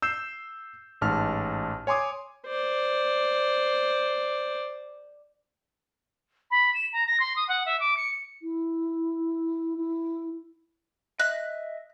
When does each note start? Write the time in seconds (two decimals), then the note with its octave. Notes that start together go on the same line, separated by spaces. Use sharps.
0.02 E6 G6 C7 E7
1.01 A1 G#2 A5 F6
1.87 C#5 G#5 C6 D6 D#6
2.47 C5 D5
6.51 B5
6.74 E7
6.93 A#5
7.07 A#6
7.20 C6
7.36 D#6
7.49 F#5
7.66 E5
7.80 D6
7.97 C#7
8.42 E4
9.76 E4
11.20 D#5 E5 F#6